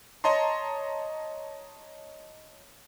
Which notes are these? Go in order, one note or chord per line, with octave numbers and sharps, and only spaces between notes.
C#5 D#5 A5 A#5 C6